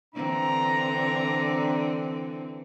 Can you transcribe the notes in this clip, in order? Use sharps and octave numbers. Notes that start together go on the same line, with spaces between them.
D3 E3 C4 D4 A#5